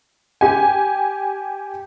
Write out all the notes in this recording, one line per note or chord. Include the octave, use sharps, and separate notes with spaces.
G4 G5 G#5